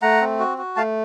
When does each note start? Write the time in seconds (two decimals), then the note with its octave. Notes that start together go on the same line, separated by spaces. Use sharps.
0.02 A3 F#5 A#5
0.21 C4
0.39 F#4
0.58 F#4
0.76 A3 F5 A5